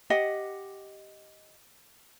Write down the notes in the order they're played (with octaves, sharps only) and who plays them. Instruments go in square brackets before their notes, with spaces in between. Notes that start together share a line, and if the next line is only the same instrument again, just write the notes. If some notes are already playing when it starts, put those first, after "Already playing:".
[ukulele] G4 D#5 F#5